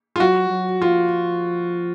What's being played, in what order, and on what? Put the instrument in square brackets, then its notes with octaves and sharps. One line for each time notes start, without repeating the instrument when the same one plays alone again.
[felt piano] F4
[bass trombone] F#3 [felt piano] F#4
[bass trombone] F#3
[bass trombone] F3 [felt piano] F4